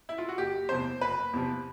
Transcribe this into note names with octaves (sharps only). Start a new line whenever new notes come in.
E4
F4
F#4
F#1 G4
E2 C3 F3 C5
F#1 B4
E2 C3 F3